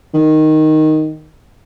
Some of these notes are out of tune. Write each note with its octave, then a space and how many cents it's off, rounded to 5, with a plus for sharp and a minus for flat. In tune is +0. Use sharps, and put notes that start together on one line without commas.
D#3 +0